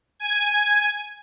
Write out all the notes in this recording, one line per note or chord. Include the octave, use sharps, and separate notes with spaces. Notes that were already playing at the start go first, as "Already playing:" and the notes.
G#5 G#6